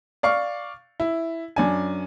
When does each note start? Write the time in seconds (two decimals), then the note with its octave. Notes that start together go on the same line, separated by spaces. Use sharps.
0.23 D5 F5 C#6
1.00 E4
1.56 F#2 D4 G#5